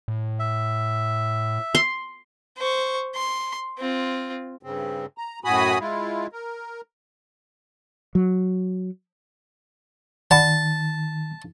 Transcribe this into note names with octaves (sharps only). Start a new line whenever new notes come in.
A2
E5
C6
C5 C#6
C6
C4 F4
G2 C#3 C4
A#5
F#2 A2 F#4 G#5 B5 D#6
G#3 E4 F4
A#4
F#3
D#3 D5 F#5 A5 B5